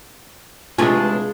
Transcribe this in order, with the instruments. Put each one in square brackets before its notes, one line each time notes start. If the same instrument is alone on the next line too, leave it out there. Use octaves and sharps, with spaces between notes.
[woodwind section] C#2 E3 D4 [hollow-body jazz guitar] C3 A3 G#5 [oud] G#3 F4